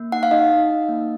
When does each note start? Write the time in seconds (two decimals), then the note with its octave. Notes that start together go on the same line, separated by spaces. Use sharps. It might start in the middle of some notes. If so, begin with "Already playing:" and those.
Already playing: A#3
0.12 D#4 F#5
0.23 F5
0.31 D#4 D#5
0.51 D#4
0.71 D#4
0.89 A#3